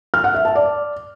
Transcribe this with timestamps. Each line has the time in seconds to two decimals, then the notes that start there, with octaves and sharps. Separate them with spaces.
0.14 F6
0.24 F#5
0.35 E5
0.45 A5
0.55 D5